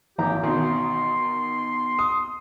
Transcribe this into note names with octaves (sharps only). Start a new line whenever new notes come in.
G#1 E3 G4 A#5
B2 D#3 C6
D#6